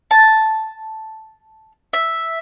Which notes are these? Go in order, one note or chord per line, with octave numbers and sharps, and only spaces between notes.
A5
E5